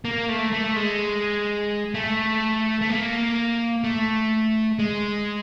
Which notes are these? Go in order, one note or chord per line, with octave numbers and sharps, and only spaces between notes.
A#3
A3
A3
G#3
A3
A3
A#3
A3
G#3